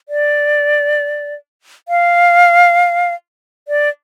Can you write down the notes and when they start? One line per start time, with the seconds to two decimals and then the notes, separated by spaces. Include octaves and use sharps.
0.09 D5
1.88 F5
3.68 D5